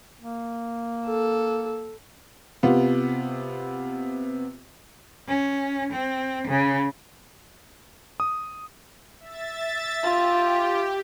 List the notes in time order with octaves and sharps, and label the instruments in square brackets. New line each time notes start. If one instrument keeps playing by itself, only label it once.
[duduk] A#3
[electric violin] A4
[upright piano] C3 B3 F4
[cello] C#4
C4
C#3
[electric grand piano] D#6
[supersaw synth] E5 A6
[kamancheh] F4 [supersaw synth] G4